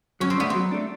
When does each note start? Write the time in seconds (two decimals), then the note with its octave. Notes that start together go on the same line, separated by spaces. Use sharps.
0.20 F#3 C#4
0.30 C4
0.38 A3 B3 D4
0.50 F#3 C4
0.71 A3 D4